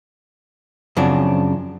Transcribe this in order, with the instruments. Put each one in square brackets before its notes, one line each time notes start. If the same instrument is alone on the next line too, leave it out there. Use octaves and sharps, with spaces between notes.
[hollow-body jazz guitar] F#2 C#3 F3 C4 D4